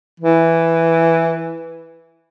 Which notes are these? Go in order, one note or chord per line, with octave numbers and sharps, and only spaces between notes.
E3